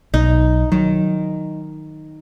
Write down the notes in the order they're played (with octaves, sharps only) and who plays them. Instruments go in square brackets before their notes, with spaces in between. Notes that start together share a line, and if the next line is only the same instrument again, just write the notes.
[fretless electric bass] B1 [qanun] D#4
[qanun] D#3 [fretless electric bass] F#3